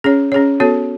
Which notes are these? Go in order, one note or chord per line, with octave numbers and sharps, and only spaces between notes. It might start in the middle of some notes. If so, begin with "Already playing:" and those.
C#4 G#4 C#5
C#4 G#4 C#5
B3 F#4 A4 C#5